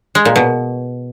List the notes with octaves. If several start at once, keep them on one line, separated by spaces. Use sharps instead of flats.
G#3
A#2
B2